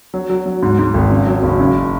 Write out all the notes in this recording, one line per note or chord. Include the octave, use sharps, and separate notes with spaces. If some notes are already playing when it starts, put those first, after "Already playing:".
F#3
F#3
F#3
G#2
G#2
G#1
C#3
F#3
F#1
C#3